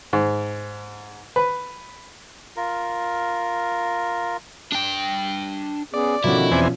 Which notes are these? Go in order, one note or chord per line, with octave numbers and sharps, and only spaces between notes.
G#2
B4
F4 A#4
D4 G5
B3 C#4 G#4 D5
B2 D3 D#3 F3 C#4 E4 F#4
E2 C4 B4 D5 E5 G#5